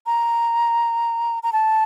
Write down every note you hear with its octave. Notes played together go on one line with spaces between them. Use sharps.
A#5
A#5
A5